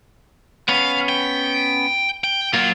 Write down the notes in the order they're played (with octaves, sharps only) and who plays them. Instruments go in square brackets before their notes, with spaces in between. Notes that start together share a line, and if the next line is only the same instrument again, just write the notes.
[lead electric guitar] B3 C#4 [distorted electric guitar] F5
[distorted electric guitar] G5
G5
[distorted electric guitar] F#3 [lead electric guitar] A#3 F4